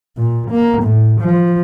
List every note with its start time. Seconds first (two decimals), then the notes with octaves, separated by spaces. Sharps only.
0.17 A#2
0.51 A#3
0.83 A2
1.21 F3